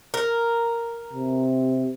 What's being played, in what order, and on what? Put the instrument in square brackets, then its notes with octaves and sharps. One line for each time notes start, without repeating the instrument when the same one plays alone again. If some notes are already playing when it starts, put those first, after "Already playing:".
[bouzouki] A#4
[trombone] C3